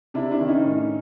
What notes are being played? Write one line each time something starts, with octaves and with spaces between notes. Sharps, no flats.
C3 D4 E4
D4 E4
D#3
C#4 D#4
A2